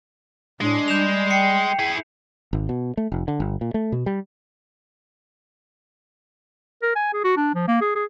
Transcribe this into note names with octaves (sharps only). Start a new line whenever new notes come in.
A2 G#3 D4
G3 G6 E7 F7
G5 C7 C#7
E4 G#4
G#1
B2
A3
F1
D3
G1
A#2
A3
B2
G3
A#4
G#5
G#4
F#4
D4
F3
A#3
G#4
G#4